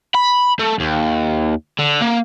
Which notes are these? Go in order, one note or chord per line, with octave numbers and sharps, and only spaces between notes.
B5
A3
D#2
D3
A#3